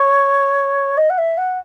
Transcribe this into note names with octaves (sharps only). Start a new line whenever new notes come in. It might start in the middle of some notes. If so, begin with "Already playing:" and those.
Already playing: C#5
D#5
F#5
E5
F#5